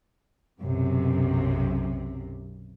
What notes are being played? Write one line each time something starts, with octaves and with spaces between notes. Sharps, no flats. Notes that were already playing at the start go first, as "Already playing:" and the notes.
B1 F#2 C3